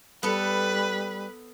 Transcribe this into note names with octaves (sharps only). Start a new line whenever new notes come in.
G3 B3 A4 B4